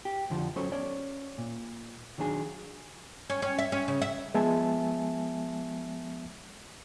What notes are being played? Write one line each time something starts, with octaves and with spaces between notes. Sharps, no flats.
G4
F2 D3 F3 D4
F#3 C#4 A4 C5 C#5
C#4 C#5 D5
A#2
D#3 F#3 D4 G#4
C#4
C#4
E5
C#4
C#3
E5
F3 G#3 B3 E5 G#5 A5